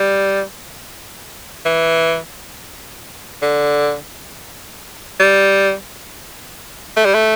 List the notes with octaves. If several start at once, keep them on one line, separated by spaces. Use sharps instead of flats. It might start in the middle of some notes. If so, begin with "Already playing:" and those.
Already playing: G3
E3
D3
G3
A3
G3
A3